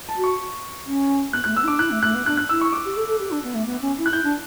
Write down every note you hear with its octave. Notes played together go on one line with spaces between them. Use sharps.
A5
F#4
C#6
C#4
B3 F#6
A3 F#6
B3 E6
E4
D4 D6
E4 F#6
A3
A3 F#6
B3
D4 F#6
F#6
E4 E6
C#6
D6
G4
A4
A4
G4
D4
B3
A3
B3
C#4
E4
F#6
E4 G6
D4